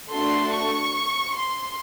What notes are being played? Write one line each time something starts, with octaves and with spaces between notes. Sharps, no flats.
A3 D4 F#4 A4 C6
C#6
C6